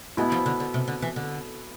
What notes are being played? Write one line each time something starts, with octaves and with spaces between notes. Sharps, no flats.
B2 G#3 B3 E4
F3
D3
D3
C3
D3
E3
D3